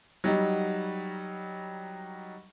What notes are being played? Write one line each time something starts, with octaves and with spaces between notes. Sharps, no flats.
F#3 G3 D#4